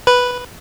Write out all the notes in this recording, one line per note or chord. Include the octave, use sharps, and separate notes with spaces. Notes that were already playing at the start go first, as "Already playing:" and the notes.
B4